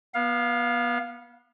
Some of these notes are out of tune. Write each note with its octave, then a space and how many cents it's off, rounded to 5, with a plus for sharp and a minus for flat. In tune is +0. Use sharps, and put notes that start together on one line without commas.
B3 -25 F5 +5